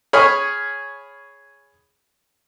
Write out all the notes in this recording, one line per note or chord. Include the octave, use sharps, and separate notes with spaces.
G#4 C#5 G#5 B5 C#6 F6